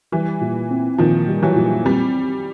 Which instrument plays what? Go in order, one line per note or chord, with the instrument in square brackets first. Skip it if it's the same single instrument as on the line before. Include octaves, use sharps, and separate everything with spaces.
[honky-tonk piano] E3 [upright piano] G3
[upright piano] A#2
C4
[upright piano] A#2 [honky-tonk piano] D#3 F3
[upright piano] G3
[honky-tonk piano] E3 F#3
[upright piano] A#2
[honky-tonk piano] G3 [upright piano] C4